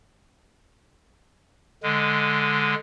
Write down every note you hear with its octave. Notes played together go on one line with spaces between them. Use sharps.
D3 G#3